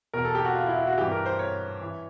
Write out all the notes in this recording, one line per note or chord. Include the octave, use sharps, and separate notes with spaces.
E2 B2 A#4
A4
G4
F#4
F4
E4
E4
F#4
G2 E3 G4
A#4
C5
C#5
E3